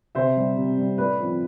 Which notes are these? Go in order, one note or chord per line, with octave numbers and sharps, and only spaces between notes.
C3 C5 E5
G3 C4
C3
G3 C4
A2 B4 D5
F3 C4